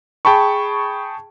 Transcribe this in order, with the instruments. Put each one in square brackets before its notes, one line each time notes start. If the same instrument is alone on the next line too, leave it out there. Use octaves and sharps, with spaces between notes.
[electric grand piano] G#4 G5 A5 B5 C#6